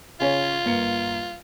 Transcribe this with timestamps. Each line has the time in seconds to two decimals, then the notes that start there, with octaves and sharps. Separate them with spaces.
0.20 C#3 C#4 F4 C#5
0.65 G1 A#3 C#7